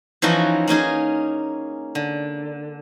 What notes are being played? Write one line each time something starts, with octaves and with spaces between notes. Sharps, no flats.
E3 F3 C#4 D#4 E4 F#4
A#3 C#4 D#4 G#4
D3